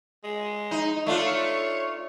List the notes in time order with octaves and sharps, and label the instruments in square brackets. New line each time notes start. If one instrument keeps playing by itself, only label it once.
[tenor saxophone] G#3
[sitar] D#4
[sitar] A3 D4 F4 [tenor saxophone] C#5